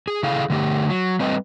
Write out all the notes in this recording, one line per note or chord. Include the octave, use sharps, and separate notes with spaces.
G#4
C#3 E4 G#4 A4 F5
D3 A3 G4
F#3
G3 A3 C4 B4 D#5